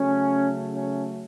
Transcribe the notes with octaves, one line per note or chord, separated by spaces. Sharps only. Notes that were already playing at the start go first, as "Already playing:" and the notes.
Already playing: C#3 F#3 A3 C#4
C#4